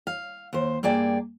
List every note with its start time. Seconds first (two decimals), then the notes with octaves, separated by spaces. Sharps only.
0.07 F5
0.53 D#2 C5
0.83 G2 A#3 G#4 D5 G5